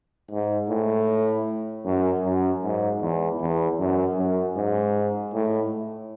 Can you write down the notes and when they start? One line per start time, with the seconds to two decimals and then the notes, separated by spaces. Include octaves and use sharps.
0.31 G#2
0.70 A2
1.86 F#2
2.25 F#2
2.63 G#2
3.02 E2
3.41 E2
3.79 F#2
4.18 F#2
4.56 G#2
5.34 A2